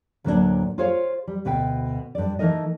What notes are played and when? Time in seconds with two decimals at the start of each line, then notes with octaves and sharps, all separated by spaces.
0.24 D2 A2 F#3 A#3 C#4 D4
0.78 F4 G#4 C5 C#5 F5
1.27 G3
1.45 D2 B2 B4 G5
2.15 G2 D5
2.39 E3 A3 D#4 A#4 D#5